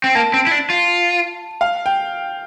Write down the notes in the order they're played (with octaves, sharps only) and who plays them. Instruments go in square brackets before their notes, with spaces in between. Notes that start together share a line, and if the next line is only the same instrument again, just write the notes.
[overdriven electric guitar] C4
[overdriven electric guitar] A#3 [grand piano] A5
[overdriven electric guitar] C4
E4
D4
F4
[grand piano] F5
G5